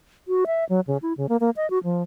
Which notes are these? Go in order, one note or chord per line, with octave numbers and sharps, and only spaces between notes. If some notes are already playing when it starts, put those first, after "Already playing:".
F#4
E5
F#3
C#3
E4
C#3
A#3
A#3
D#5
F#4
F3